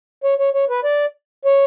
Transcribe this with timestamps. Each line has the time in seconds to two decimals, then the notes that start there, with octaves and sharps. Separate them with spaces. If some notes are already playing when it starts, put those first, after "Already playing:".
0.24 C#5
0.39 C#5
0.54 C#5
0.70 B4
0.84 D5
1.45 C#5